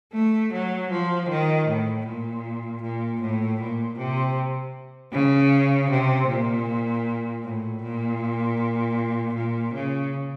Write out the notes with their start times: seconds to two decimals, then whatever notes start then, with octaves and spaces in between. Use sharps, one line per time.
0.13 A3
0.52 F#3
0.90 F3
1.29 D#3
1.67 A2
2.06 A#2
2.81 A#2
3.21 A2
3.60 A#2
3.98 C3
5.12 C#3
5.90 C3
6.28 A#2
7.44 A2
7.82 A#2
9.35 A#2
9.74 C#3